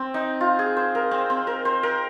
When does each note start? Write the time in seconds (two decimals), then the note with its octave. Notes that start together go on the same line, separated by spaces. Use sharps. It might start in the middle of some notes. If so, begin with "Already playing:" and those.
Already playing: C4
0.14 D#4
0.41 F4
0.59 G#4
0.77 C5
0.95 A#4
1.11 C4
1.30 C4
1.47 A#4
1.65 C5
1.83 A#4